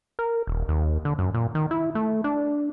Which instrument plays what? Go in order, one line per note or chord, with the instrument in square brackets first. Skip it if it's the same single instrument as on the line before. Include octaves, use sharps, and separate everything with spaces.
[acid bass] A#4
D#1
D#2
D3
F#2
A#2
D#3
E4
A3
D4